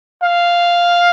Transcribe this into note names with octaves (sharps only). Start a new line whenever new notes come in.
F5